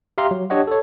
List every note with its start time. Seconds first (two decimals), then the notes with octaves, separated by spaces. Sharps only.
0.18 G4 E5 F5 A#5 C6
0.31 F#3
0.50 D4 G4 C#5 D#5 F#5
0.67 A4 C#5